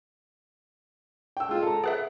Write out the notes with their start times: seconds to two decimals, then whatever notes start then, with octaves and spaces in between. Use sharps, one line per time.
1.37 G5 E6
1.49 G#3 F4
1.63 A4 A#5
1.84 G#4 B4 E5 F#5